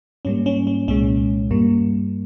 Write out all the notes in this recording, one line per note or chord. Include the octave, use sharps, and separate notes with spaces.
G#2 G3 A#3 C#4
C#4
C#4
C2 A#2 G#3 C#4
G2 G3 A#3